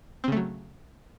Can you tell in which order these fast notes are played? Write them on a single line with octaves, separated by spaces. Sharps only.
C4 C#3 A3 F#3